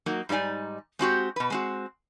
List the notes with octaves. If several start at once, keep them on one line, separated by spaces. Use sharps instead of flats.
F#3 A#3 D#4 F#4
G#2 G3 D#4 D5 G#5
G#3 C4 F#4 G4
B2 B4
G#3 C4 F#4